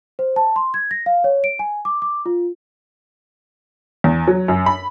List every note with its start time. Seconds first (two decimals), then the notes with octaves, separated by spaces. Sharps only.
0.19 C5
0.36 A5
0.56 C6
0.74 G#6
0.91 A#6
1.06 F5
1.24 C#5
1.44 D7
1.59 G#5
1.85 D6
2.02 D6
2.26 F4
4.04 E2
4.27 F#3
4.48 F#2
4.66 B5